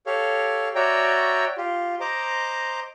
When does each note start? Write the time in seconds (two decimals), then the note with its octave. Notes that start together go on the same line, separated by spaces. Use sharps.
0.06 G4 A4 C#5 F5
0.75 F#4 C#5 D5 E5 G5 A#5
1.57 F4 G4
2.00 C5 D#5 A#5 D6